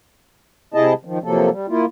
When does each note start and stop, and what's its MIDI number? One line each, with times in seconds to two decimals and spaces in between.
0.74 0.93 48
0.74 0.93 64
0.74 0.93 68
0.74 0.93 75
0.74 0.93 81
1.05 1.19 51
1.05 1.19 53
1.24 1.50 48
1.24 1.50 53
1.24 1.50 54
1.24 1.50 58
1.24 1.50 69
1.51 1.66 55
1.68 1.86 58
1.68 1.86 64
1.68 1.86 65